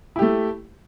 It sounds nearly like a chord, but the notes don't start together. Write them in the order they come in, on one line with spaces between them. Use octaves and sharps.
E4 G4 A3